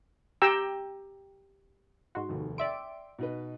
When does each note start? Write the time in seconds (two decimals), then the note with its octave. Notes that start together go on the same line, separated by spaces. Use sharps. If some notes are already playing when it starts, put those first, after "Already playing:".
0.42 G4 G5 A#5 E6
2.15 G#2 F#4 C6
2.29 F1 D#2
2.58 D5 E5 G5 C6 D7
3.19 B2 D#4 B4